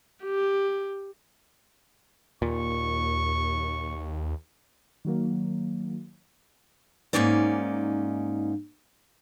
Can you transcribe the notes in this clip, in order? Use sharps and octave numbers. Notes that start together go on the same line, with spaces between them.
G4
D#2 A#2 C#6
D#3 F#3 A#3
G#2 E3 A#3 C#4 D#4 D5